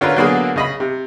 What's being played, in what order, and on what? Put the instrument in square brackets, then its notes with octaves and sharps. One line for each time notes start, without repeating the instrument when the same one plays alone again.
[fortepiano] D3 C#4 F4 F#4 A#4 B4
D3 F#3 A#3 B3 F#4 G#4
C#3 D#5 B5
C3